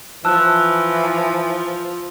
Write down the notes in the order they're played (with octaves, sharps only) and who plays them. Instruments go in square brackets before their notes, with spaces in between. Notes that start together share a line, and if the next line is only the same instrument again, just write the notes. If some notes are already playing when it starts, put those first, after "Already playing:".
[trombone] E3 [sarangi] F3 [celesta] A5 F#6 [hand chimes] E6